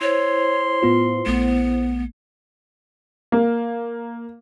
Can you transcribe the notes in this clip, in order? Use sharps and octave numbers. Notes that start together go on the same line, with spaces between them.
E4 C5 C#5 C6
A2 B3 F4
A#1 A3 B3
A#3